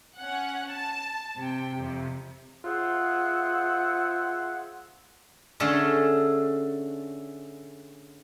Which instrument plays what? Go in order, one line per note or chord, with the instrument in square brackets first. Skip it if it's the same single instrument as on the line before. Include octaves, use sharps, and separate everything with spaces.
[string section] C#4 F#5
A5
C3 G5
F2 C3
[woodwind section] F4 G#4 C5 E5 F#5
[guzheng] D3 A3 C#4 G#4 A4